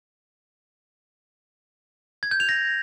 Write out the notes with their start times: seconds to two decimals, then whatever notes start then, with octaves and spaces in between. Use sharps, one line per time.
2.23 G#6
2.31 G6
2.40 F7
2.49 A#6